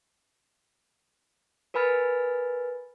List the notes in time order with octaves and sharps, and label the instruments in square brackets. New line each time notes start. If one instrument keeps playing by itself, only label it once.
[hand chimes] A#4 B4 G#5 B5 F6 A6